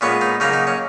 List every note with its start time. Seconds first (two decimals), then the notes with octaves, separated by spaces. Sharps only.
0.01 A#2 G#3 B3 C#4
0.21 D#4
0.40 C#3 F#3 A#3 D#4
0.53 D#4
0.67 C#4